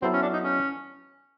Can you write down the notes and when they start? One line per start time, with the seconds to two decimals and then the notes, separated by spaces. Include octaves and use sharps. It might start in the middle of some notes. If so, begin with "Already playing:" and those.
0.02 F#3 B3 C4 E4 A4
0.13 C#4
0.22 D4
0.33 D#4
0.43 C#4